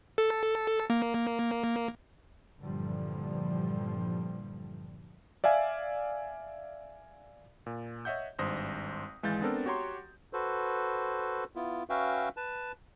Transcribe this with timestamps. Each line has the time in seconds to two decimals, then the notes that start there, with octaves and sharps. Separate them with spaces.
0.18 A4
0.90 A#3
2.59 G2 A#2 D3 E3 F3 G3
5.44 D5 E5 F5 G#5
7.66 A#2
8.05 C#5 D#5 E5 F#5 G6
8.39 G#1 G2 C5 D#6 A#6
9.23 G#1 E3 G#3 F5 G6 A6
9.42 B3 C4 D4 A4 A#4
9.66 F#4 G4 C#5 A#5 C6
10.33 F#4 A4 B4 C5
11.56 B3 E4 F4
11.90 C#4 F#4 B4 E5 F5 G5
12.37 B4 A5